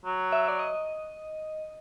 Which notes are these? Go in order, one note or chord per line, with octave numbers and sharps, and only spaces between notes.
F#3
E5
D5
D#5